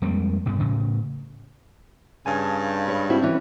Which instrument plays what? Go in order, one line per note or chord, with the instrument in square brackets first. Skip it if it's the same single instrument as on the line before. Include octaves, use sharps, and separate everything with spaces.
[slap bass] F2 G3 G#3 A#3
G2 B2
A2 C#3
[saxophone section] G2 C#3 [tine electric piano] G#5 A5
[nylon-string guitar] C#5 [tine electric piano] B5
[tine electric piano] C4 [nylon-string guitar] E4 F#4
[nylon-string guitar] E3 C#4 C#5